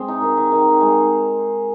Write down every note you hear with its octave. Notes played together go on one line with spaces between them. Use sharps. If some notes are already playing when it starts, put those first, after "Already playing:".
Already playing: G#3 C4
D#4
D#3
D#3
D#3
D#3
G#3